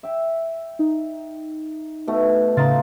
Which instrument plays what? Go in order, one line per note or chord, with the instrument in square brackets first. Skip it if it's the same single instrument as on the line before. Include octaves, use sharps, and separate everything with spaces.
[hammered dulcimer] E5 G5
[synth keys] D#4
[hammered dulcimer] B2 A3
[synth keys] A2 C#3 A6 [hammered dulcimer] D#4 F4